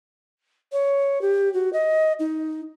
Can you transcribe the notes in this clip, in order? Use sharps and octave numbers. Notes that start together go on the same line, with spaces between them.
C#5
G4
F#4
D#5
D#4